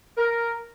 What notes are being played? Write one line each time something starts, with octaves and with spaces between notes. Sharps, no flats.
A#4